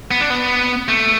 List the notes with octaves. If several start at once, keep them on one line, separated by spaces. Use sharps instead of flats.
B3
D4
B3
A3